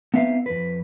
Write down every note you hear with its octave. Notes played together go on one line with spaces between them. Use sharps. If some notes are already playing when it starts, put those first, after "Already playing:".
B3 C4 D#4 B4 E5 F5
F2 B4